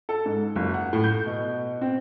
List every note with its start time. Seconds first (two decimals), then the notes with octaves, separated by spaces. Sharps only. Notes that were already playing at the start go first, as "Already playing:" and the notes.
0.09 A4
0.25 G#2
0.56 F#1
0.74 F#5
0.93 A2
1.04 G6
1.26 B2
1.81 C4